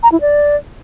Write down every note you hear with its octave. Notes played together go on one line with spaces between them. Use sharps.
A#5
E4
D5